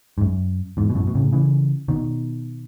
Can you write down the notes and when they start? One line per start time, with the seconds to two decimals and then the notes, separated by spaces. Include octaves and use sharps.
0.18 G#2
0.21 F#2
0.77 E2 G#2
0.90 B2
0.95 F#2 A2
1.07 B2
1.15 A2 C#3
1.33 C#3 E3
1.88 B2 D#3